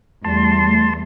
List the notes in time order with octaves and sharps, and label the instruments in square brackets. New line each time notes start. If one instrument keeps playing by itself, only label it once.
[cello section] E2 G3 A3 [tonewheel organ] A5 C6